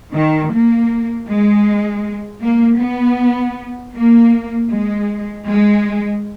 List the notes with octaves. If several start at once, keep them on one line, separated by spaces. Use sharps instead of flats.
D#3
A#3
G#3
A#3
B3
A#3
G#3
G#3